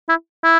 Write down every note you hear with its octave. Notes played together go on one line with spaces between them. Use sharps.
E4
E4